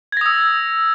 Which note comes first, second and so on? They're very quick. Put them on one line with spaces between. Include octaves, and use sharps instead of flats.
G#6 A#6 D#6 E6